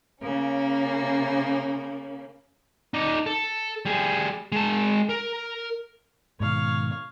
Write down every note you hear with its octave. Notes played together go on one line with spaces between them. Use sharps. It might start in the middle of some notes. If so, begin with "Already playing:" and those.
C#3 A#3 C#4
D#4 D5
A4
G3 G#4
G#3 A5
A#4
G#2 B2 D#3 C#5 F5